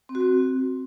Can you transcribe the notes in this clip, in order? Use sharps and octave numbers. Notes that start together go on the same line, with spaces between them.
C4
F#4
C4